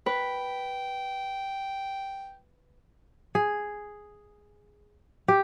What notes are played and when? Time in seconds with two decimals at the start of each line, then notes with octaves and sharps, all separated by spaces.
0.06 B4 G5
3.35 G#4
5.28 G4